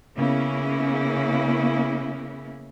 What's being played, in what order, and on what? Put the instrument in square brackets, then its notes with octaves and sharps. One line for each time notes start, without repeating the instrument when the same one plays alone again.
[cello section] C#3 A#3 B3 C#4 E4